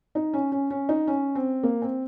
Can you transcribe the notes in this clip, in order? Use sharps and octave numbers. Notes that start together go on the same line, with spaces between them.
D#4
C#4
C#4
C#4
D#4
C#4
C4
A#3
C4